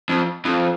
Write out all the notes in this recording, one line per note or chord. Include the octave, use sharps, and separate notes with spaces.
F2
F2